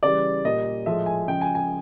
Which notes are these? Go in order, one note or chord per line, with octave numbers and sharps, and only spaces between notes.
C#3 E3 G3 D5
A#2 G3 D#5
A2 F3 G#3 E5
G#5
C#3 F3 G#3 G5
G#5
G#5